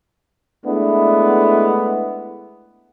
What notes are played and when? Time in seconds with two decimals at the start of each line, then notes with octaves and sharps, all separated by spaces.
0.66 G#3 A3 B3 D4 E4